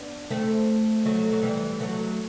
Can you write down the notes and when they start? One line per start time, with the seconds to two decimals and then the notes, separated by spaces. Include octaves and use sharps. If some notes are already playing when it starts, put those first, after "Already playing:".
Already playing: B3 D4
0.31 A3 C4
1.05 F#3 A3
1.32 F#3
1.42 E3 G3
1.80 F#3 A3